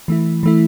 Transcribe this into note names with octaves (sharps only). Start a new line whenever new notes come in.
E3 A3 E4
E3 A3 E4